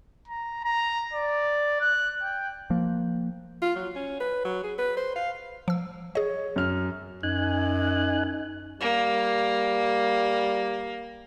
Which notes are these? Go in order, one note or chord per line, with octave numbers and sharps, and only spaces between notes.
A#5
A#5
D5
F#6
G5
F3 A#3
F4
F#3
C#4
B4
F#3
G#4
B4
C5
F5
F3 E6
G#4 C#5 D#5
F#2 F6
F#2 D#4 G#5 F#6
G3 A#3